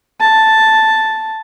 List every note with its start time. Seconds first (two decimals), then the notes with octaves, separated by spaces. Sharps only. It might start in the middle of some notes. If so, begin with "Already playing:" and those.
0.20 A5